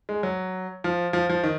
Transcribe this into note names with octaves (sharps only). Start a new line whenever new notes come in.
G#3
F#3
F3
F3
F3
D#3